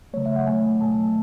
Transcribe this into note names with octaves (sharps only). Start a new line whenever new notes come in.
C#3 F#3 A3 C#5
E5
F#5
D#3 F#3 A3 G#5
B2 F#3 A3 A5